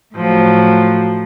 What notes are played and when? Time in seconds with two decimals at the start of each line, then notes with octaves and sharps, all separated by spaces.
0.14 A2 F3 F#3